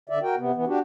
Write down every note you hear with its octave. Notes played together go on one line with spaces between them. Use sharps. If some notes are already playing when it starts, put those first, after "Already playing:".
D3 D5 E5
F#4 A#4 G5
C3 B3
E3 B3
D4 F#4 G4